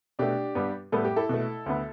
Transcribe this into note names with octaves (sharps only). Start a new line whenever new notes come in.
B2 A3 D4 G4
G2 G3 B3
A2 G3 B3 A4
G4
E4 A4
B2 A3
D2 D3 B3